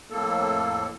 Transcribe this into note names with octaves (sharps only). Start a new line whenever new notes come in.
F2 A2 A#3 A4